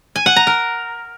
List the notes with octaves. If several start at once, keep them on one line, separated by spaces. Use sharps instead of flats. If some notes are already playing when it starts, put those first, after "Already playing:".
G#5
F#5
A#5
A#4